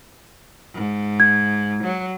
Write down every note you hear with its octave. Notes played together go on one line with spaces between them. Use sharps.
G#2
G#6
F#3